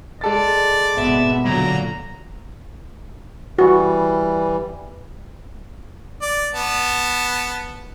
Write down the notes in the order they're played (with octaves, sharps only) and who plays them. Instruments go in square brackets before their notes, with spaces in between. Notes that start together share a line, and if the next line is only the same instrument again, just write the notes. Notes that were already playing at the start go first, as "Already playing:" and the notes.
[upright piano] G#3 A4 A6 [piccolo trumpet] D5
[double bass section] G#1 B2 B3 [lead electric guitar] E5
[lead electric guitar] A#2 [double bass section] D3 F#3 [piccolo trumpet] A#5
[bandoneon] E3 G3 [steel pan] F#4
[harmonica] D5
B3 A5